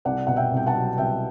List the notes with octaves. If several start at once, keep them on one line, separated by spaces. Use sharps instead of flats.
C2 D5 F#5
B2 F#5
E5 G5
C2 G5
F#5 A5
F#3
C2 E5 G5